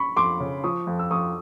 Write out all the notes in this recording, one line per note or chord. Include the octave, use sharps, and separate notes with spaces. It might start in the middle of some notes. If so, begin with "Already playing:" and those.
Already playing: B5 C#6
F2 C6 D6
C#3
F3 C#6 D#6
F2
E6
F2 C#6 D#6